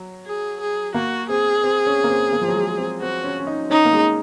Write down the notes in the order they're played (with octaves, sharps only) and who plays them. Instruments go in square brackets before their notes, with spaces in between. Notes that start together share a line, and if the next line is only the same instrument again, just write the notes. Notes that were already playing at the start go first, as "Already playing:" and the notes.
Already playing: [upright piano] F#3
[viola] G#4
G#4
[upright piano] A#3 [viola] F#4
[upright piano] C4 [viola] G#4
[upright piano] C4
C#4
A#3
C4
A#3
F3
F#3
G#3
C4
[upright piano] C4 [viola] F#4
[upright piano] C#4
C#4
D#4
[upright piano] C#4 [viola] D#4
[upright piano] A#3
G#3